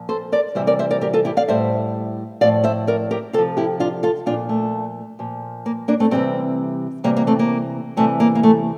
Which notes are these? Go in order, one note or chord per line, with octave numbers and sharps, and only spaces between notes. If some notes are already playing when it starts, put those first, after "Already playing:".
Already playing: A#2 F3
A4 C5
A#4 D5
C3 E3 G3 C5 E5
A#4 D5
C5 E5
A#4 D5
G4 A#4
F4 A4
E4 G4
D5 F5
A2 G3 C5 E5
A2 F3 D5 F5
C5 E5
A#4 D5
G4 A#4
C3 F3 F4 A4
E4 G4
D4 F4
F4 A4
A#2 F3 D4 F4
A3
A#2 F3
A#3
A#3 D4
A3 C4
C3 E3 G3 A3 C4
C3 E3 G3 A#3
A#3
A3 C4
A#3
C3 E3 G3 A3
A#3
A#3
A3